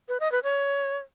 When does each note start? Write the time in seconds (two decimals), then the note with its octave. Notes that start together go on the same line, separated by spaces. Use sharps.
0.08 B4
0.20 D#5
0.32 B4
0.43 C#5